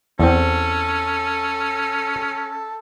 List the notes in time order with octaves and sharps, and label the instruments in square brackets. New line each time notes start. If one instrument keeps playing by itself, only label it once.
[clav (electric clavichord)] E2 C4 [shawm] C#4 [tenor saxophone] A4